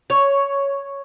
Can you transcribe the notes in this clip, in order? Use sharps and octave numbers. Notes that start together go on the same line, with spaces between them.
C#5